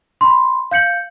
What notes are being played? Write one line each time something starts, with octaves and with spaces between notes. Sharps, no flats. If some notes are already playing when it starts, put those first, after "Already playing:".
B5 C6
F5 G6 C#7 F#7